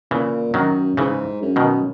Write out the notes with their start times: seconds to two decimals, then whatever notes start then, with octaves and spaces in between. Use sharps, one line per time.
0.11 A#2 C#3 E3
0.54 F#2 D#3 F#3
0.97 G#2 C#3 E3
1.42 F#2
1.56 B2 D#3